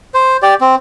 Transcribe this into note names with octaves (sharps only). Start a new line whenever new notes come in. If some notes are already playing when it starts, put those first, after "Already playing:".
C5
G4 D5
C4